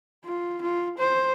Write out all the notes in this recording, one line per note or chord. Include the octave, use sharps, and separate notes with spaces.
F4
F4
C5